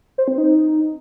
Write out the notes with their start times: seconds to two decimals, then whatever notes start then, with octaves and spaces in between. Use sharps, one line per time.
0.18 C5
0.28 C4
0.38 D#4